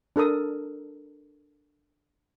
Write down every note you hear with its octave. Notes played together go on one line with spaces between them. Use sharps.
D4 A4 A#4 D#6